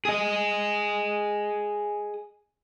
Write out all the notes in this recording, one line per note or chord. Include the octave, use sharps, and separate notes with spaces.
G#4 D#5